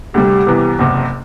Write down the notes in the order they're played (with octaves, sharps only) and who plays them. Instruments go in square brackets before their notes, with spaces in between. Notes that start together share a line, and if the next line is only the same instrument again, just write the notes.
[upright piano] D2 C3 G3 [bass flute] G4
[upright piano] C2 C3 E3 B3
F#1 E2 C3